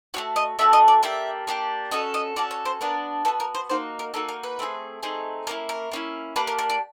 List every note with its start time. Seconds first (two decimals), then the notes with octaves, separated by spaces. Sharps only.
0.14 A3 D4 F#4 C#5
0.36 D#5
0.59 A3 D4 F#4 E5
0.73 D#5
0.88 D5
1.03 A#3 D4 G4 E5
1.47 A#3 D4 G4
1.91 C#4 F#4 A4 D#5
2.14 D#5
2.36 C#4 F#4 A4 D5
2.51 C#5
2.65 C5
2.81 B3 D4 F#4 A#4
3.25 B3 D4 F#4 A4
3.40 A#4
3.55 C5
3.70 A#3 D#4 F#4 C5
3.99 A#4
4.14 A#3 D#4 F#4 A4
4.29 A#4
4.43 B4
4.59 A3 C4 D#4 G#4
5.03 A3 C4 D#4 G#4
5.47 A#3 C#4 E4 A#4
5.69 A#4
5.92 A#3 C#4 E4
6.36 A#3 D4 G4 B4
6.47 A#4
6.59 A#4
6.70 D5